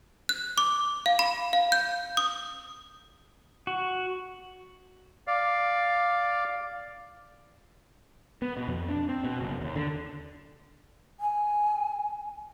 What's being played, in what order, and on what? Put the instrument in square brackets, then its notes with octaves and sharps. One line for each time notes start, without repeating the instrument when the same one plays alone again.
[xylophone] F#6
D6
F5
B5
F5
G6
D#6
[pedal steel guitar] F#4
[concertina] D5 F5
[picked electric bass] B3
B2
F2
D4
C4
B2
F#1
D#2
D3
[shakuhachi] G#5